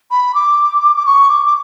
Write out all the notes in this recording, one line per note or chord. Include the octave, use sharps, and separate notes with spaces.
B5
D6
D6
C#6
D6
D6